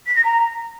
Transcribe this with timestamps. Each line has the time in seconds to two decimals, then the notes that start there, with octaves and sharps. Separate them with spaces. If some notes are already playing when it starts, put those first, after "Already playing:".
0.07 B6
0.15 A#6
0.24 A#5